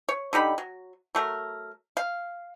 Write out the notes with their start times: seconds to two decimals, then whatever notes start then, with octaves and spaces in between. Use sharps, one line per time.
0.09 C#5
0.33 D3 D#4 G4 B5
0.58 F#3
1.15 F#3 A3 A#4
1.97 F5